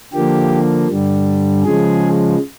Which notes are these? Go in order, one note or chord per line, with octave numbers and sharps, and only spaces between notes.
D3 F3 A#3 G4
G2 D3 G3
C#3 F3 G#3 G#4